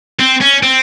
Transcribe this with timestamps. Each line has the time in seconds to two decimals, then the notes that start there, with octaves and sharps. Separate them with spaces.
0.19 C4
0.41 C#4
0.63 C4